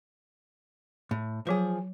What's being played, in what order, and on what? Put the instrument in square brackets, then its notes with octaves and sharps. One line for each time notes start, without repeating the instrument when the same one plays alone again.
[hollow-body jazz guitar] A2
[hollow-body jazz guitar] F3 G#4 [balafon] F#3 B4